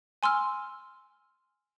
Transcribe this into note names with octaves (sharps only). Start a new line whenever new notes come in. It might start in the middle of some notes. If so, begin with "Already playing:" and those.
G#5 C6 E6 F6